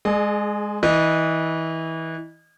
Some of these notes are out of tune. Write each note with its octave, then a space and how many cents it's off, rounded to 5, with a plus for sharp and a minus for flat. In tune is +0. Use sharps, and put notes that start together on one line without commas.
G#3 +0 G#4 +30 D#5 -40
E3 -25 D#5 -15